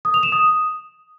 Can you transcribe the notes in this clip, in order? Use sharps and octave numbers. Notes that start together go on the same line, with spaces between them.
D#6
F7
E7
D#6